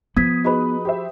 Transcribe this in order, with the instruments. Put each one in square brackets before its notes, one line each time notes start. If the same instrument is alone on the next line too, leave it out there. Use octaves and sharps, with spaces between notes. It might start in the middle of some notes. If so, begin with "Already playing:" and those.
[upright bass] F3 F4 [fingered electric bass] B3 [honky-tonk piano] D#6 [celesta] G#6 B6
[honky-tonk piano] D#4 B4 [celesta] F#4 G#4 B5
[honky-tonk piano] G4 C5 E5